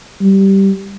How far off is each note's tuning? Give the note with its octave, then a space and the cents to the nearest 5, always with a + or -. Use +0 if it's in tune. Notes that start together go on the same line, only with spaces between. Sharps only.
G3 -10